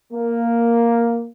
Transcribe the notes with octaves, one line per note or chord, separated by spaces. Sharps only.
A#3